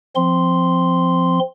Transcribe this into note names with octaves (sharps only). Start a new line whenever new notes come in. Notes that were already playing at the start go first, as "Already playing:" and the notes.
F3 C4 C6